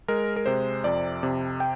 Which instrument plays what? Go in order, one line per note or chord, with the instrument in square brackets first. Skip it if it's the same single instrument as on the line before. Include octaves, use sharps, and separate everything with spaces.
[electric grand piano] G#3 A#4
A#4
C3 C5
F2 D5
C3
G5